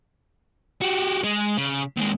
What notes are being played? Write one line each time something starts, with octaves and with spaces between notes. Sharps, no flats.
F#4 G4
G#3
C#3
D#2 G#3